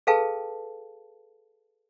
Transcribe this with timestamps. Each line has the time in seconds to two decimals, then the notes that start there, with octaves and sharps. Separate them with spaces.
0.07 G#4 A4 B4 F5 G5 A5